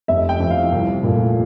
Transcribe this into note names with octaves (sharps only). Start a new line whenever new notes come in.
F1 E5
G5
F2 E3
F5
C2
A#2 F3 A3